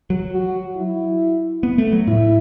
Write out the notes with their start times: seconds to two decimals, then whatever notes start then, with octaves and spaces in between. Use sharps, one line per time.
0.10 F#3
0.32 F#4
0.76 E4
1.63 B3
1.78 A3
1.92 F#3
2.07 A2 E4